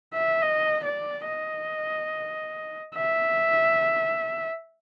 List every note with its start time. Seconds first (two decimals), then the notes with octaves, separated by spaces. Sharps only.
0.14 E5
0.42 D#5
0.84 D5
1.26 D#5
2.95 E5